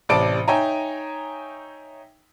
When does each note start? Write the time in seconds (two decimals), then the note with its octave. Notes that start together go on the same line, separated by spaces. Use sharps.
0.09 A1 C3 D5 A5 D7
0.48 D#4 C#5 E5 G5 G#5 A#5